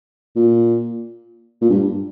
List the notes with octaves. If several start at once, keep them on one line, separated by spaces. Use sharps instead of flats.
A#2
A#2
G2